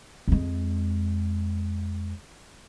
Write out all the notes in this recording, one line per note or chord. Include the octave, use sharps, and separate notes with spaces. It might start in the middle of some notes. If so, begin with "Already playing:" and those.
F2 G#3